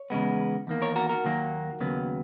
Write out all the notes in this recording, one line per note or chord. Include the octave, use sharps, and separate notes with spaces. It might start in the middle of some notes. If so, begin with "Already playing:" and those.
Already playing: C#5
E2 C#3 G#3 B3
E2 D#3 A#3
A#4 C#5
F#4 A#4
F#4 A#4
D#2 D#3 F#3 A#3
D#2 C#3 F#3 B3